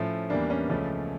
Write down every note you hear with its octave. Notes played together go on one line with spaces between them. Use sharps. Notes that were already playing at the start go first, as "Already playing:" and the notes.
Already playing: A2 F3 A3 C#4
E2 E3 G3 A#3 D4
C#4
C#2 C#3 F3 A3 C#4